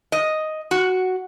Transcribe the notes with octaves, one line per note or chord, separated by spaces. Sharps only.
D#5
F#4